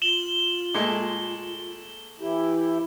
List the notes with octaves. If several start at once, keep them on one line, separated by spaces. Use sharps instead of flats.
F4 E7 F#7 G7
A#2 G#3 A3
E3 E4 G4